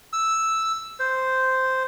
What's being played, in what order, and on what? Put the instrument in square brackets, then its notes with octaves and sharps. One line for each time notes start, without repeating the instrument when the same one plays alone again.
[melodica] E6
C5